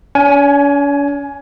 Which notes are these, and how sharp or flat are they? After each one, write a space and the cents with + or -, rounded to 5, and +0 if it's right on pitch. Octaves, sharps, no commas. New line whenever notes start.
C#4 +45 G#5 +10